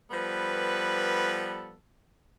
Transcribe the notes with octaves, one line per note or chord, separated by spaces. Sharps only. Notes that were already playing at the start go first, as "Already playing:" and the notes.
F3 G3 B3 A4 B4